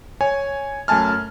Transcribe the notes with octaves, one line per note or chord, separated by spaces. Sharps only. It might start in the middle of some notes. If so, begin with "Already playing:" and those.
C#5 G#5
F#2 A3 G#5 A5 F6